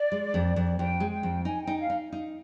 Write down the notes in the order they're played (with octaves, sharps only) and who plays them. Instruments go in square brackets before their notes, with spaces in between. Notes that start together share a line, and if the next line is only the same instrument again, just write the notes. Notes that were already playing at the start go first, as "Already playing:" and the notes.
Already playing: [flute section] D5
[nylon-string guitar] G#3
F2
F2
[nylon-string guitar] F2 [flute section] G5
[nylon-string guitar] G#3
[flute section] G5
[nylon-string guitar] F2
[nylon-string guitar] D#4 [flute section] G#5
[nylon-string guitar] D#4 [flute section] G5
[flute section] F5
[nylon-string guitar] D#4
D#4